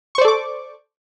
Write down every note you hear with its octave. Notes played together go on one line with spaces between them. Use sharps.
A4 C5 D5 C#6 D6